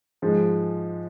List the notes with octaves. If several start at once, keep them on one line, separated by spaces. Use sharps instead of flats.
G#2 F3 G#3